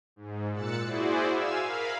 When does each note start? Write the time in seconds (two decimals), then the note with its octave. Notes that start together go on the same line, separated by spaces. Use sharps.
0.16 G#2
0.52 A#2 E6 F#6 A6 C#7
0.85 E4 F#4 G#4 C5 D5
1.29 F5 G#5 E6
1.63 A#4 F5 B5